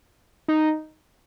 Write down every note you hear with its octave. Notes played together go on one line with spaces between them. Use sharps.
D#4